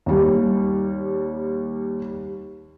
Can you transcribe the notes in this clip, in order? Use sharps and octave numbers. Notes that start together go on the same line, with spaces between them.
D#2 G3